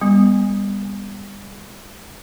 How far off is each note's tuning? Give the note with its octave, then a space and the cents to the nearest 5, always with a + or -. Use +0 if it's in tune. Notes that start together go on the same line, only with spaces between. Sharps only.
G3 +35 B3 +0